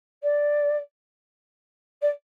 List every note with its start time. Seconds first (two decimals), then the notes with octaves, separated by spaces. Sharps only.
0.23 D5
2.01 D5